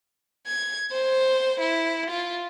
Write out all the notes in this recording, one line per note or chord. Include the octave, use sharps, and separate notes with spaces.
G#6
C5
E4
F4